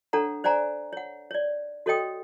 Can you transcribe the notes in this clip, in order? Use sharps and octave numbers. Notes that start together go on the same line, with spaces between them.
D4 A4 C#5 F#5 A#5
C5 D5 F#5 G#5 A#5
C#5 F#5
C#5 D5
F#4 A4 C#5 D#5 G5 D#6